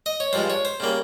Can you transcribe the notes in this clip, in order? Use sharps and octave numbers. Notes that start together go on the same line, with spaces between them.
D#5
C#5
G2 F3 G#3 C5
C#5
C5
C#3 G3 A#3